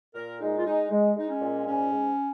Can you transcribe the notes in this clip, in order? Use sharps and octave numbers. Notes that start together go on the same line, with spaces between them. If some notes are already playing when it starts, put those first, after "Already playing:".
A#2 A#4
G#3 D#4
F4
G#3 D#4
G#3
G#3 D#4
C#4
A#2
G#2 C#4
G#2